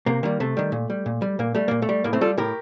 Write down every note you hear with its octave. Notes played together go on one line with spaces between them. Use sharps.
C3 A#3
D#3 G3 A#3
C3 A3
D#3 G3
A#2
G3
A#2
G3
A#2 A#3
G3 A3
A#2 A#3
A3
G3
A2 A#3
A3 C4
G3 F4 A4
A2 G4 A#4